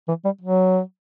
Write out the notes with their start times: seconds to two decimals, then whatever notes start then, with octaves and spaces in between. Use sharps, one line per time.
0.08 E3
0.25 G3
0.41 F#3